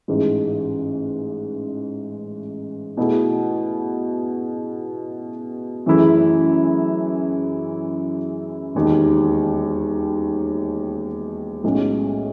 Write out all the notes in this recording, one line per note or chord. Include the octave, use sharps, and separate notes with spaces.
A1 G#2 E3 G#3
B2 A3 E4 G#4
F#2 E3 A3 E4 G#4
E1 D#2 D#3
B1 A2 G#3 C#4 F#4